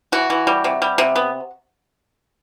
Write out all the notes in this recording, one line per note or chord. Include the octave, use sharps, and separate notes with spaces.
E3 F#4
E3
G3
C3
G3
C3
B3